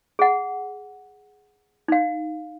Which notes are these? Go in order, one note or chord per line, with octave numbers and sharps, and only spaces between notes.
G#4 F#5
D#4 F5